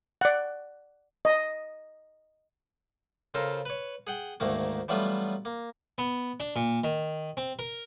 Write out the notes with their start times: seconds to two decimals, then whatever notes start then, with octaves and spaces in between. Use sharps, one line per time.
0.21 D5 F#5
1.25 D#5
3.34 C#3 F4 A4 A#4 C5
3.65 B4 C#5
4.07 G#4 F#5 G5
4.40 D2 G#2 D#3 A3 A#3
4.88 E3 F#3 G3 A3 B3 F4
5.45 A#3
5.98 B3
6.40 D4
6.56 A#2
6.84 D#3
7.37 C4
7.59 A#4